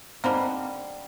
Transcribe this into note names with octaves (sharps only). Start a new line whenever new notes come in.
D3 G3 A#3 C4 D#4